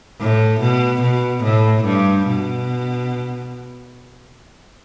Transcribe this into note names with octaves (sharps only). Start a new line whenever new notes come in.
A2
B2
B2
A2
G2
B2